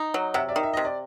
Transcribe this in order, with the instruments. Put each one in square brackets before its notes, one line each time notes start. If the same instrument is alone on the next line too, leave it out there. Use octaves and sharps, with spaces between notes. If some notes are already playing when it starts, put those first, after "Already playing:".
Already playing: [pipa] D#4
F#3
[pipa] C3 [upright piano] E5 F#5
[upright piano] D5 E5
[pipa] D#3
[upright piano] E5
[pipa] C3 [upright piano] D#5
[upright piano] D5